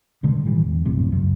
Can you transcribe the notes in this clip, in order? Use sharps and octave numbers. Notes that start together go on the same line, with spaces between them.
G2 B2 D3 G#3
A2 D#3 E3 G3
E2
A#1 F#2 A2 C3
C#2 F#2